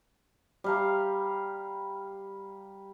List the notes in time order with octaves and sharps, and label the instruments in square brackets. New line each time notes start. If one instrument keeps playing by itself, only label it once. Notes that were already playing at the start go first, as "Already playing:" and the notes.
[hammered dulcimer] G3 F5 A#5